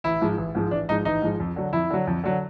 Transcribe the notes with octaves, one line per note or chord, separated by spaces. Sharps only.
A1 E4
G#2 F3 G#3
A1
G#2 F3 G#3
A1 D4
G#2 F3 G#3 D#4
A1 D#4
G#2 F3 G#3
F2
D3 F#3
F2 E4
D3 F#3
F2
D3 F#3